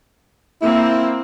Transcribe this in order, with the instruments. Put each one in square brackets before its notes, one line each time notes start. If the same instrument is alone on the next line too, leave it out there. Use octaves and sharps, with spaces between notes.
[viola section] A#3 C4 [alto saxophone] E4